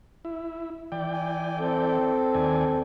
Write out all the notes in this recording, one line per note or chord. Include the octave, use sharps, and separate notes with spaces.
E4
E3 D5 G5
G#5
C4 A4
D#2 D5 G#5